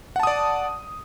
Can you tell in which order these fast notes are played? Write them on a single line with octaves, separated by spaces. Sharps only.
F#5 A5 D#6 D5